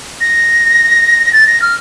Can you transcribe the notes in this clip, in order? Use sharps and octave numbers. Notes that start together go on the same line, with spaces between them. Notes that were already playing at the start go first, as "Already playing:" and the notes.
A#6
A6
A#6
F6